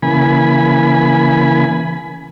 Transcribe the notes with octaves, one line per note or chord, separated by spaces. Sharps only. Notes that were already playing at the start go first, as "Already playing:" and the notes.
C#3 E3 A#3 G#5 B5